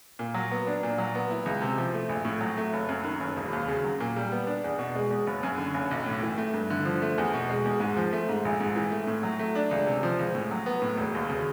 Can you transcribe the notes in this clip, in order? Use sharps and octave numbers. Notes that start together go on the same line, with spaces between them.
A#2
F#3
B3
D4
A#2
F#3
B3
E4
C#2
C3
F3
A3
A#1
A2
F#3
A3
F#1
F#2
D#3
F#1
E1
D#2
C#3
F#3
A#2
G3
B3
D4
E2
B2
G#3
E2
F#1
F#2
D3
F#1
B1
A2
E3
A3
G2
D3
F3
A3
E2
B2
G#3
E2
G#2
F3
A3
G#2
A#1
G#2
E3
A3
A2
F#3
A3
D4
C#2
C3
F3
C#2
A2
F#3
B3
A2
E1
D#2
C#3